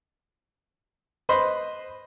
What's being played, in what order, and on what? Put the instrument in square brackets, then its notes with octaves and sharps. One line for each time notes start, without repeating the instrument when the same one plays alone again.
[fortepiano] B4 C5 D#5 B5 C6